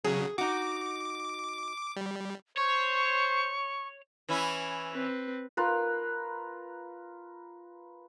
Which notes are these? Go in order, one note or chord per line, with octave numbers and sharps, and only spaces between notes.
C#3 F#3 G#4
D#4 F#4 D6
G3
C5 C#5 C#6
E3 C#4 E4
C4 B4
F4 A#4 B4